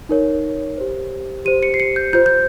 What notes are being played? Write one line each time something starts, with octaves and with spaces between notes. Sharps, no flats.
D#4 A#4 C#5
G4 C5
G4 C5 D#7
C#7
C7
C#7
G6
F4 C5 G6
G6